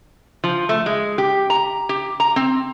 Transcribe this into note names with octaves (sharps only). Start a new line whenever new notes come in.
F3
A3
G#3
G4
A#5
G4
A#5
C4